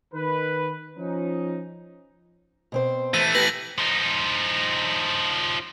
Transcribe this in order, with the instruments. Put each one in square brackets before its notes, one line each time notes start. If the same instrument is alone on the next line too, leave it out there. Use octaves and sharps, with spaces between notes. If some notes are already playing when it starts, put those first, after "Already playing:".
[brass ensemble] D#3 B4
F3 C#4 D#4
[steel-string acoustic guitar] B2 C4 C5
[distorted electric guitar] E3 A3 [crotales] D#7
[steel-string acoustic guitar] G4 B4 [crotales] A#6 F#7
[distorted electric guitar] F3 D#4